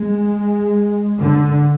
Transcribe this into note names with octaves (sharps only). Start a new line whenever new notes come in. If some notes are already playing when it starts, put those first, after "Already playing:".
Already playing: G#3
D3